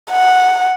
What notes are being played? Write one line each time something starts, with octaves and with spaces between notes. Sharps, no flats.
F#5